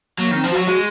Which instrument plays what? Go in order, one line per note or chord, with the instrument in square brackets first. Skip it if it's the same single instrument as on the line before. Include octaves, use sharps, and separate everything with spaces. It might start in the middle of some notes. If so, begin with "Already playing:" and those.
[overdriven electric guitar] F#3 [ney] A#3
[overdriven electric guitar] D#3 [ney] C4
[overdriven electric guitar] F3
[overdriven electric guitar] F#3 [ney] F#4
[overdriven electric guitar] G#3 [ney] F#4